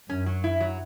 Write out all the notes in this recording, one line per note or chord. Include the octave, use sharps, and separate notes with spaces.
F#2 C#4
F#3
E4
F#3